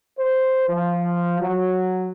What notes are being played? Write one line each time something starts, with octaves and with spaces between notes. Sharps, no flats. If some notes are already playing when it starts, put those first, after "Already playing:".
C5
F3
F#3